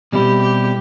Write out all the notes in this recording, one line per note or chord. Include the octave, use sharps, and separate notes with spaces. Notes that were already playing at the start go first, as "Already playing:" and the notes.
B2 G3 C4 E4 G4
G4